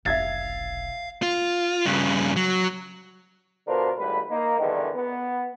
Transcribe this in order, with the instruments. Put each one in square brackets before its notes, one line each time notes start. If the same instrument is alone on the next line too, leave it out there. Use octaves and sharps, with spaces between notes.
[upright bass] F1 B1 [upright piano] E5 G#6 A6 [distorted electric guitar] F5
[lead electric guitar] F4
G2 C#3
F#3
[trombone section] B2 D3 D4 F4 A#4 C5
G#1 A2 G3 B4
A#3 D#4
E2 G2 D3 D#3
B3